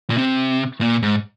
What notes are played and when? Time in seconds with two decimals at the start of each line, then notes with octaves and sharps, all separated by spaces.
0.10 A#2
0.17 C3
0.81 A#2
1.02 G#2